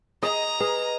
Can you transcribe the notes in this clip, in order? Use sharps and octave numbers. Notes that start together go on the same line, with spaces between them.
G#4 D#5 A#5
G#4 B4